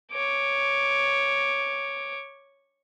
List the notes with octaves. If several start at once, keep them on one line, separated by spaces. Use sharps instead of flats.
C#5 D6